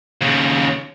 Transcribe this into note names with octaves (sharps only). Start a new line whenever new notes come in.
D#2 C#3